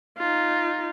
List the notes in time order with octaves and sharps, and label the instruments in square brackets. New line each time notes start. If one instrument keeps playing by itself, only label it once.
[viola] D#4 F4